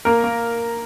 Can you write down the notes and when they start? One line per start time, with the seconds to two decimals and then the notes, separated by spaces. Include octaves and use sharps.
0.05 A#3 A#4
0.24 A#3